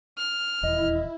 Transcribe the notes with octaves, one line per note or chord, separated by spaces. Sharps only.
F6
D#1 E2 E4 D#5